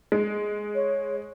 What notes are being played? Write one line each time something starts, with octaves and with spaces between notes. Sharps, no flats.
G#3
C#5